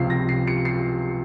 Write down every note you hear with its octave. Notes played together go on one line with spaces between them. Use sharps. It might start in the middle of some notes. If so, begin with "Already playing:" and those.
Already playing: C#2 C3 F3 C7
A#6
C7
C#7
C7